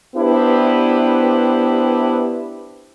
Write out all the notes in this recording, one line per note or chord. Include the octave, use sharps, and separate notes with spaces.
B3 D4 E4 G4 B4 C5